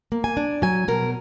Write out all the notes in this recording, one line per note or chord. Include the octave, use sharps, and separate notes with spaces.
A#3
G#5
D4
F#3 G#5
B2 A#4